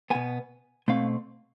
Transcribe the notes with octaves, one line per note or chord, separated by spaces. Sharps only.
B2 B3 G#5
B2 A3 C4 F5